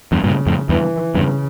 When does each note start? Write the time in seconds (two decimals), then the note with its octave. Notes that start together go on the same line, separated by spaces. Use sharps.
0.12 E2 G2
0.24 G2 A#2 C#3
0.46 F2 A2
0.69 E2 G2 E3
1.15 E2 G2 C#3